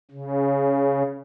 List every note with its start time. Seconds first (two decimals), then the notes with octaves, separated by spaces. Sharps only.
0.11 C#3